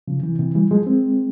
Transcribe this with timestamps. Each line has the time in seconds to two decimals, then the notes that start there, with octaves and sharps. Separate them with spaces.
0.08 C#3 F3
0.23 C3 E3
0.39 C3 E3
0.55 E3 G3
0.71 F3 G#3
0.87 G#3 C4